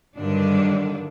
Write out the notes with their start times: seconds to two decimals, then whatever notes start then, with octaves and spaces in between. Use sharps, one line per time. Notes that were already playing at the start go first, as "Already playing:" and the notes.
0.16 G2 D3 D#3 F#3 D4